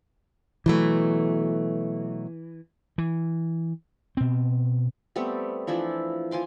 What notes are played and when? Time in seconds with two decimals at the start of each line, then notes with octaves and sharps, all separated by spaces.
0.66 B2 E3 F#3 A3
2.98 E3
4.17 B2 C4
5.16 G3 A3 B3 C4
5.67 E3 F3 D4 E4
6.31 F3 G#5 C6 D6